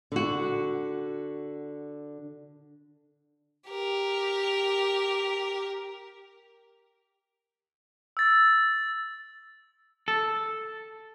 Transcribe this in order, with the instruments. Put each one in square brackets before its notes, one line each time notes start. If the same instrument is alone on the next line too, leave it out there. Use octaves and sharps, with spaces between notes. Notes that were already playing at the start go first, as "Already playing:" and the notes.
[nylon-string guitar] D3 F#4
[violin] G4 A#4
[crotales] E6 A6
[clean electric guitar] A4